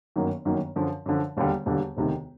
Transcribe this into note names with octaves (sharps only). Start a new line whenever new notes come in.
G1 F#2 D#3 F#3 A#3
G1 F#2 D#3 F#3 A#3
F#2 D3 F3
F#2 D3 F3
E1 D#2 D3 G3
E1 D#2 D3 G3
E1 D2 C3 D#3